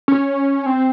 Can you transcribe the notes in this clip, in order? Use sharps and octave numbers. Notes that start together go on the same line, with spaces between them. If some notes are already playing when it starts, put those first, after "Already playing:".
C#4
C4